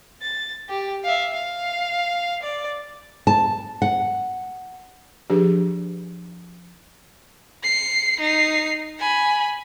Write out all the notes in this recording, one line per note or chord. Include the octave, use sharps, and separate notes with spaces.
A6
G4
E5 F5
F5
D5
A5
F#5
F3 D4 G4 G#4 B4
C7 C#7
D#4 C7
G#5 B5